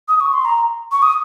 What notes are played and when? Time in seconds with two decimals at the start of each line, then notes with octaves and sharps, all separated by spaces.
0.08 D#6
0.21 C#6
0.33 C6
0.45 A#5
0.92 C#6
1.02 D#6